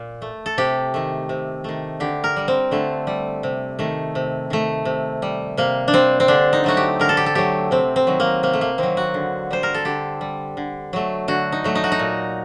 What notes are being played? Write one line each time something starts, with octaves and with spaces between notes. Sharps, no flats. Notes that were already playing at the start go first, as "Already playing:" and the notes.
Already playing: A#2
A3
A4
C3 G4
D#3 A3
C3
D#3 A3
D3 G4
A#4
G3
C4
D3 A3
G3
C3
D#3 A3
C3
D#3 A3
C3
G3
C3 A#3
D4
G3 C4
C4
D3 D4
D#4
F#3 A3 F#4
G4
D3 A#4
A4
G4
A4
F#3 A3 G4
C3 C4
C4
D#3 F#3
A#3
C3 A#3
A3
A#3
D#3 F#3 C4
F#4
D3
G3 C5
A#4
A4
D3 G4
G3
D3
F#3 A3
D3 F#4
D#4
F#3 A3
D#4
F#4
D#4
A#2